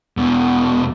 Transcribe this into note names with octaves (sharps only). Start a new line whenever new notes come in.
E2 B2